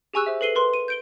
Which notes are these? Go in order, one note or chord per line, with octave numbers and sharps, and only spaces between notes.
G4 G#4 G#5 C#6 E6 F#6
C5 E5
A4 B4 C7 D#7 G7
A#4 B4 C6 G7
D#7
G6 D7 G7